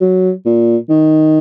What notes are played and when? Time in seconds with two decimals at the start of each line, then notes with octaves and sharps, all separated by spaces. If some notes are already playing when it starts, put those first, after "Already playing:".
0.01 F#3
0.46 A#2
0.89 D#3